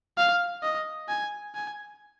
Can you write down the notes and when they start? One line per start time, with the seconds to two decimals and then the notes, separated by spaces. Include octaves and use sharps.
0.17 F5
0.63 D#5
1.09 G#5
1.55 G#5